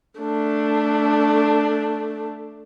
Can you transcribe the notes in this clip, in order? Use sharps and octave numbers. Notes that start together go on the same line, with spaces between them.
A3 D4